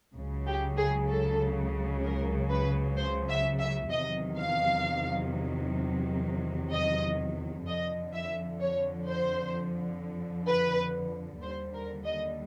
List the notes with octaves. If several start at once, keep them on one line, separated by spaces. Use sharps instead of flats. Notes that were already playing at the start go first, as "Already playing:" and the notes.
C#2 C#3 F#3
G4
G#4
A4
A#4
B4
C5
E5
E5
E2 C3 D#3 F#3 D#5
F5
D#5
F2 D3 F3 D#5
E5
C#5
C5
B4
D#2 D3 G3 C5
A#4
D#5